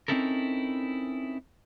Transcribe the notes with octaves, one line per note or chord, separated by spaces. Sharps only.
C4 C#4 D#4 E4 A4 A#4